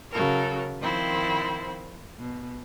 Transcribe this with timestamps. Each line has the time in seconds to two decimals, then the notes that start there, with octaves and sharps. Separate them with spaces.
0.12 C#3 F#3 A4 A#4
0.81 D#3 F3 C4 E4 C5
2.20 B2